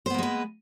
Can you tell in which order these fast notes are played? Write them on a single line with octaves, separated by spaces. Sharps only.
C5 B3 A#3 G#3 B4